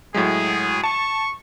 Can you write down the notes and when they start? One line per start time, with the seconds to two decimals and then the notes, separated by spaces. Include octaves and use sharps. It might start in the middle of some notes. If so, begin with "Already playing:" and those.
0.14 A2 F#3 G#3 G#4
0.84 A5 C#6